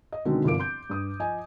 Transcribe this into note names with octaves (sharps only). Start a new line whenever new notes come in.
D#5
B2 D3 D#3 F#3 G#3 C4
G1 C2 F3 A#4 D6 D7
C6 G6
G2 D#6
F3 D#5 G#5